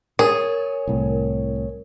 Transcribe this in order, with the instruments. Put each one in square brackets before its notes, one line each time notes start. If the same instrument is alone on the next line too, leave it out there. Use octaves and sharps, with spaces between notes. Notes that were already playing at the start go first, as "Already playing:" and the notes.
[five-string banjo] G#4 [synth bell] A#4 [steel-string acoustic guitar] C#5 G#5
[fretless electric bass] C2 A2